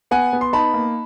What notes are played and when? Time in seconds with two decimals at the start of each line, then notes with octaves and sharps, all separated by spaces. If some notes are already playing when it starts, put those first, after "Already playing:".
0.11 B3 F#5 G#5
0.33 B3
0.41 C6
0.53 D#4 A5 B5
0.74 A#3